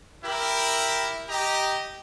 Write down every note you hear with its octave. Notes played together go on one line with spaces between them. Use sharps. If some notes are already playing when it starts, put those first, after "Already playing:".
E4 G4 A#4 B5
G4 D#5 G5 A#5